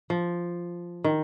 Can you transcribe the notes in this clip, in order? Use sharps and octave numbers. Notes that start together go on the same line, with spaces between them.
F3
D#3